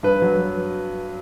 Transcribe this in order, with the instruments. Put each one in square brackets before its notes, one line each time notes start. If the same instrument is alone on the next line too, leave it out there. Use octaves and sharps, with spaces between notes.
[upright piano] G2 B4
F#3